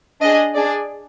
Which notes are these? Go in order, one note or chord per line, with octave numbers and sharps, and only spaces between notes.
D4 G#4 D#5
D4 G#4 D5